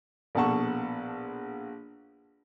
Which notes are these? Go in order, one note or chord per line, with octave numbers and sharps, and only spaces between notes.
A#1 B2 A4 F#5 A5 C#6